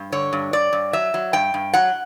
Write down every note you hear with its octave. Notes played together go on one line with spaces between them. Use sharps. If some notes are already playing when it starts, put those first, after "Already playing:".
Already playing: G2
D3 C#5
G2
G2 D5
G2
F#3 E5
F#3
G2 G5
G2
F#3 F#5